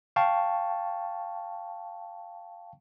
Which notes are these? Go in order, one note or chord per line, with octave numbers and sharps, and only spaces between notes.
F5 G5 A5 C#6